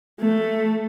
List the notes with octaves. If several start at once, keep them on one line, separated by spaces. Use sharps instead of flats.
A3